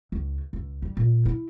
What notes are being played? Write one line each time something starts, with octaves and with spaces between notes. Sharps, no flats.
C#2
C#2
G3
A#2
E4